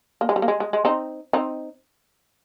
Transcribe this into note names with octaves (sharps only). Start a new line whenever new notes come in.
A#3
G#3
G3
A#3
G#3
G#3
G#3
C4 D#4
C4 D#4